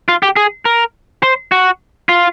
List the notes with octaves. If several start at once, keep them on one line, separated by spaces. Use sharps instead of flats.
F4
G4
G#4
A#4
C5
F#4
F4